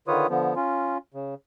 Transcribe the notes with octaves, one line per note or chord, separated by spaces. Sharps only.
D3 D#3 F4 B4 C#5 D#6
D3 F3 B3
C#4 F4
C#3